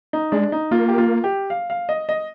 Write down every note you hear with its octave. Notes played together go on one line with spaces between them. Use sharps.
D#4
G#3 D4
D#4
A#3 F4
G4
F4
G4
F5
F5
D#5
D#5